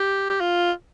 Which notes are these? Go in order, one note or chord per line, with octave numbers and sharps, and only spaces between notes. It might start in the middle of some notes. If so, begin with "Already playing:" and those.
Already playing: G4
G4
F4